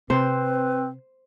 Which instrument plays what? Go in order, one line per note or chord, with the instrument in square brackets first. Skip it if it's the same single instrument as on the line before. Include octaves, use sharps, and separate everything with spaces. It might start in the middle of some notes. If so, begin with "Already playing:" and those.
[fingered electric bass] C3 [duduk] C4 [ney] B4 [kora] C5